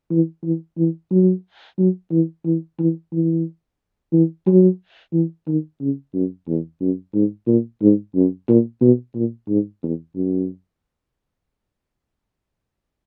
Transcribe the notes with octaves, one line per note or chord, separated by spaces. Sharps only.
E3
E3
E3
F#3
F#3
E3
E3
E3
E3
E3
F#3
E3
D#3
C#3
F#2
E2
F#2
G#2
A#2
G#2
F#2
A#2
B2
A#2
G#2
E2
F#2